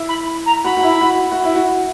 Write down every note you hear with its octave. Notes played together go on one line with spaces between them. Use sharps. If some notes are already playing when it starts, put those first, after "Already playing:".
Already playing: E4
B5
A#5
F#4 B5
F#4
E4
F#4
F#4
E4
F#4